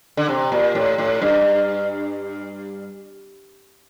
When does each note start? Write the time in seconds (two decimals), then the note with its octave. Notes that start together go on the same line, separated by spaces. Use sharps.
0.17 D3
0.29 C3
0.52 A#2
0.75 A2
0.98 A2
1.22 G2